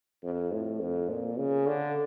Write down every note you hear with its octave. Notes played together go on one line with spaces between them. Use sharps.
F2
A2
F2
A#2
C#3
D3